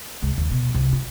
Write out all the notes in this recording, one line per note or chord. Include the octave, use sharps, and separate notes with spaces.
C#2
D#2
B2
C2
F4